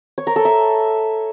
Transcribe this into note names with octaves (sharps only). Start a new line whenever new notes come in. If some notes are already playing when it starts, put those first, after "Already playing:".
C#5
A#4
A4
E5